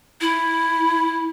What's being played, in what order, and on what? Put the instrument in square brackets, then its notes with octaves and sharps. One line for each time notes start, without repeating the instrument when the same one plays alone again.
[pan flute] E4